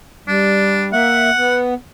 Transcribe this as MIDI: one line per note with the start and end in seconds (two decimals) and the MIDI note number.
0.28 0.92 55
0.28 0.85 62
0.93 1.30 58
0.93 1.30 76
0.93 1.57 78
1.37 1.74 59